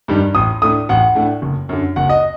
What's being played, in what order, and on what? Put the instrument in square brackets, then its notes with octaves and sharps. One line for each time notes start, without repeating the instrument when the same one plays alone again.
[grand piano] G2 D#3 G3
A1 D#6
A2 A3 D4 D#6
A1 F#5
A2 A3 D4
F#1
F#2 D3
F#1 F#5
D#5